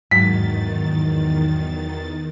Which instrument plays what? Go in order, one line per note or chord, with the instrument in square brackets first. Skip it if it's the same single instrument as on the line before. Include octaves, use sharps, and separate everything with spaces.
[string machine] E2 D#3 A6 [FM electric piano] G#2 [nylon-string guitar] F#3 [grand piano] B6